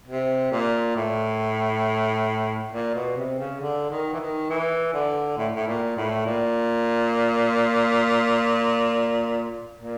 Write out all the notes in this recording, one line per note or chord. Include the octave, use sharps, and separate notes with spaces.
C3
A#2
A2
A#2
B2
C3
C#3
D3
D#3
E3
D#3
E3
D3
A2
A2
A#2
A2
A#2
A#2